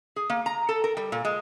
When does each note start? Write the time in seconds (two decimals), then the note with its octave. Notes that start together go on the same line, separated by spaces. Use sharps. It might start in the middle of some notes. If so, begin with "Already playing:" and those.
0.16 G#4
0.30 A#3
0.46 A#5
0.69 A4
0.84 A#4
0.97 G3
1.12 A#2
1.25 G#3